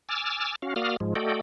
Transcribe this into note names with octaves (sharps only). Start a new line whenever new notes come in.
G#5 D6 E6 F6 A6
C#4 F#4 F5
A#3 F#4 D5 F5 D#6 F6
G#2 F3 G#3
A3 F#4 A4 D5 D#5 G5